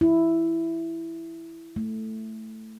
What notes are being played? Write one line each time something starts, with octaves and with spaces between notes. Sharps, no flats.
E4
A3